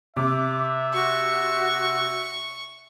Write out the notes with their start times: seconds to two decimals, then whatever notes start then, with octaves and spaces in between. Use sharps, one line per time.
0.17 C3 E5 D6
0.93 F#4 C#6